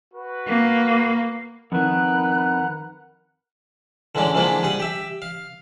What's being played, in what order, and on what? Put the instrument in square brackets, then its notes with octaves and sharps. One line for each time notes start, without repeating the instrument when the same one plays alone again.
[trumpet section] F#4 B4
[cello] A#3
[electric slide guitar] F2 D#3 [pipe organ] A#4 F#5 A#5 [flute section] B4 B5 F#6
[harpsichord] D3 E3 G#3 C#4 D5
E3 F3 G#3 A#3 B3 D4
G3 G#4 F#5
G4 E5
F5